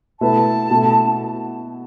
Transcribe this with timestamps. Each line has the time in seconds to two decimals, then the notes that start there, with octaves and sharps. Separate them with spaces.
0.20 B2 A3 E4 B4 A5
0.70 B2 A3 E4 A4